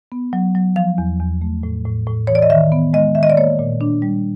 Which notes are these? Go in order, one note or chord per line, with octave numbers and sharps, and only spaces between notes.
B3
F#3
F#3
F3 F5
E2
E2
A3
A2
A2
A2
E3 C#5
D5
D#5
D#3 E5
B3
G#3 D#5
D#3 E5
D#5
D5
A#3 C#5
A#2
D4
G3